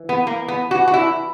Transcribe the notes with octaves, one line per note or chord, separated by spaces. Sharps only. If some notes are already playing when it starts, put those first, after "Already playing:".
Already playing: E3
B3
A#3
B3
F#4
F#4
E4